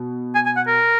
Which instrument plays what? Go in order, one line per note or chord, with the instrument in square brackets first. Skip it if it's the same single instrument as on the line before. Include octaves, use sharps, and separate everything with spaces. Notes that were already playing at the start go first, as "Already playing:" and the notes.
Already playing: [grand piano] B2
[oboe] G#5
G#5
F#5
A#4